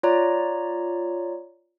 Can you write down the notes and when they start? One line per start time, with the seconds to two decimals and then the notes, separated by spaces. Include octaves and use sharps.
0.03 F4 C#5 D5 A#5